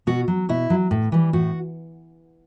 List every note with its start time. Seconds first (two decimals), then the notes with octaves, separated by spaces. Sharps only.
0.07 B2 F#4
0.28 F#3
0.49 B2 E4
0.70 F#3
0.91 A2
1.12 E3 G3
1.33 A2 F#4